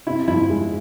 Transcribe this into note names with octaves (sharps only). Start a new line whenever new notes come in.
C3 E4
F3 E4
G#3